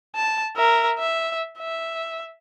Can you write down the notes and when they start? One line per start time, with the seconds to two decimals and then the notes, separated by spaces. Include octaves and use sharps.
0.16 A5
0.57 A#4 E5
0.99 E5
1.59 E5